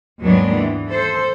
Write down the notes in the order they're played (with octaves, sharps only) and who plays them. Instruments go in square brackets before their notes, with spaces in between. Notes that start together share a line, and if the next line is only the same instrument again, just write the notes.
[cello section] D#2 G#2 F#3 G#3 B3 D4
E3
A4 C5